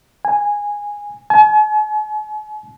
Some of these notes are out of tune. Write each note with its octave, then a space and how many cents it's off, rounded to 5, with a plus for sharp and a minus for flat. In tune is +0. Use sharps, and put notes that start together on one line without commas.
G#5 -10
G#5 +45